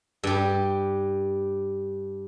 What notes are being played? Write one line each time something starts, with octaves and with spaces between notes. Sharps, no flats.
G2 G4